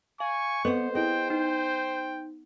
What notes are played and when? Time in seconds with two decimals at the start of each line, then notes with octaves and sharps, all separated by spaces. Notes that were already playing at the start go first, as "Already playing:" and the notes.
0.20 F5 G#5 C#6
0.65 B3 C4 A4 C5 D#5 F#5
0.95 E4 G#4 D#5 G5
1.30 D#4 G5